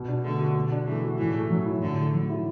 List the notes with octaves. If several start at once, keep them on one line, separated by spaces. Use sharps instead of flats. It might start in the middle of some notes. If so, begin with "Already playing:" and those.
Already playing: B2
D4
D3 A3
F#4
B2
D4
E3 A3
F#4
A2 E3
A3
F#3
E4
A2 D3
A3
F#3
E4